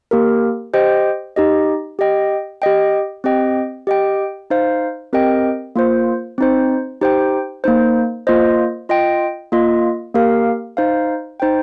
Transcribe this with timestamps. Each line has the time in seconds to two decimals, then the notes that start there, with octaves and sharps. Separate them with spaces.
0.11 A#3 G4 A#4
0.74 G4 C5 D#5 G5
1.36 D#4 G4 D#5
1.99 G4 D#5 G5
2.62 G4 D#5 G5
3.24 C4 G4 D#5 G5
3.87 G4 D#5 G5
4.51 D#4 C5 F5
5.13 C4 G4 A#4 D#5 G5
5.76 A#3 F4 C5
6.38 C4 D#4 C5
7.01 D#4 G4 C5 G5
7.64 A#3 D#4 C5
8.27 A#3 F4 C5 D#5
8.89 F4 D#5 G5
9.52 A#3 F4 D#5
10.15 A#3 G4 A#4 F5
10.77 D#4 C5 F5
11.40 D#4 C5 G5